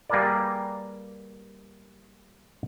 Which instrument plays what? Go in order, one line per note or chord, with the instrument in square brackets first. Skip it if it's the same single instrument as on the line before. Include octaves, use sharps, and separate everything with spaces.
[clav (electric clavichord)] G3 A#3 G#4 A#4 B4 D5